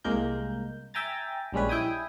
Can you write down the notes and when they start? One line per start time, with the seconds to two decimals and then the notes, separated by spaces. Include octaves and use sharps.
0.04 C2 G#3 A#3 A#4 G6
0.94 E5 G5 G#5 A#5 A6
1.52 A#1 G3 G#3 C#4 B4
1.69 E4 G5 G#5 D#6